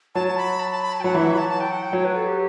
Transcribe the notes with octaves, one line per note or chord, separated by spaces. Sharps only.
F#3 A5
A5
B5
A5
A5
B5
A5
G5
F#3 F#5
E3 E5
F#3 E5
B5
A5
A5
G5
F#5
G5
F#3 C#5
B4
A4
G4